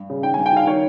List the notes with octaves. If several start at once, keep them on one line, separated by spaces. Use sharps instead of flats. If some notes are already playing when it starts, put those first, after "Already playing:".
Already playing: G2
C#3
D#3 G5
G#5
G2
G5
D#3 F5
D#3 C#5